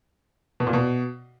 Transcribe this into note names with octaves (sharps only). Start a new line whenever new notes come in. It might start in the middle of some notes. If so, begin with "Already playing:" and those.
B2
A#2
B2